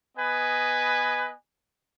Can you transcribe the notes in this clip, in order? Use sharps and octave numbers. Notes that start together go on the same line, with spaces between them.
B3 B4 D#5 G#5